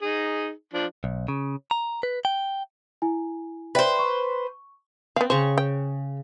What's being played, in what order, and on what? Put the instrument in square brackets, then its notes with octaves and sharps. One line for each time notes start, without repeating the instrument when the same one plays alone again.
[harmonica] D#4 G#4
F3 D4
[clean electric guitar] B1
C#3
A#5
B4
G5
[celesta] E4 G#5
[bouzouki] B4 C5 [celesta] D5 E5 G5
[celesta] C#6
[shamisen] B3 F5 [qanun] C4
[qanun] C#3 C#6 [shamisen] C5
[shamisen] G5